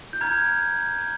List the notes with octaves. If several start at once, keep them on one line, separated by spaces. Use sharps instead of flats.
G6
A#5 F6 G#6